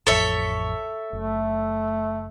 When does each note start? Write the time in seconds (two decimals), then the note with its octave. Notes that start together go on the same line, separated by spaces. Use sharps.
0.07 A1 F2 A4 C#5 E5
1.13 F#1 A3